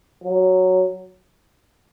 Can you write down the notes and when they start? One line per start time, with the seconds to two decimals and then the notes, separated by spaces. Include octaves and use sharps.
0.23 F#3